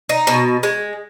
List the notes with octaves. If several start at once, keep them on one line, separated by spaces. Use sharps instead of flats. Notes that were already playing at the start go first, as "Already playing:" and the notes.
D#4
B2
G#3